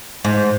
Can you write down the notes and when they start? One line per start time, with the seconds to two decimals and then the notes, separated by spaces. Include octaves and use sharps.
0.25 G#2